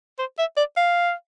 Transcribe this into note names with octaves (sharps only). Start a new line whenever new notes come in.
C5
E5
D5
F5